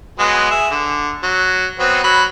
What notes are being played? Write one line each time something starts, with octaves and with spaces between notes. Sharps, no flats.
F#3 G#3 B3
G#4 E5
D3
F#3
F#3 B3 C4
F#3 B5